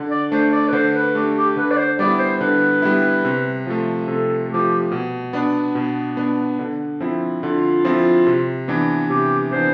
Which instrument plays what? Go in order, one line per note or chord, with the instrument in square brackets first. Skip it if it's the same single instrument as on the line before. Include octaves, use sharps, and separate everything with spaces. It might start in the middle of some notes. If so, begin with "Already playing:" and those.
Already playing: [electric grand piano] D3
[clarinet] D5
[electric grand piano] A3 D4 [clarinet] C5
[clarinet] D5
B4
[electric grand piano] D3 [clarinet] C5
[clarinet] B4
[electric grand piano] A3 D4 [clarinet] G4
[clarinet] G4
[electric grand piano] D3 [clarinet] B4
[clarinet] D5
C5
[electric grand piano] G3 B3 E4 [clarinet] D5
[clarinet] C5
[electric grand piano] D3 [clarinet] B4
[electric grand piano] G3 B3 E4
C3
F3 A3
[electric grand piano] C3 [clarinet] A4
[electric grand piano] F3 A3 [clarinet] G4
[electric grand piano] B2
B3 D4
B2
B3 D4
D3
F3 C4 E4
[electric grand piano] D3 [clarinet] F4
[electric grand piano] F3 C4 E4
C3
E3 B3 D4
[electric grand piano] C3 [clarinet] G4
[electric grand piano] E3 B3 D4 [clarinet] C5